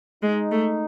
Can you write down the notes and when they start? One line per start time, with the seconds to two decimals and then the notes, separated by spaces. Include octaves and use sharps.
0.22 G#3 D#4
0.52 A3